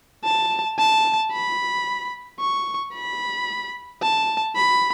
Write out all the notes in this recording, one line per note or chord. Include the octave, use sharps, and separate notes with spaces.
A5
A5
B5
C#6
B5
A5
B5